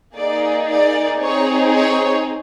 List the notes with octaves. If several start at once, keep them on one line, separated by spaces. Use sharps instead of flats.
A#3 D#4 G#4 D5
D5
C4 D#4 G#4 C#5
C#5